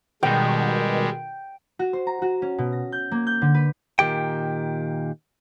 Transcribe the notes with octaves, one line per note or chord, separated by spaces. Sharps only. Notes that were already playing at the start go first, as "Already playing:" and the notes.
B2 D#3 G3 G#3 G5
F#4
C5
A#5
F#4
C#4
B2
A#6
G6
A#3
G6
D3
B4
A#2 D#3 G4 G5